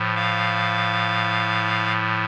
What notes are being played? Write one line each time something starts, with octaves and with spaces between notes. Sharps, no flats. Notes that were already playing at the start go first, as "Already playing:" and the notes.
Already playing: A2 F3
F5